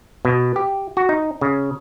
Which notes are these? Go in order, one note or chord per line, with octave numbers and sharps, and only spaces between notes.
B2
G4
F#4
D#4
C#3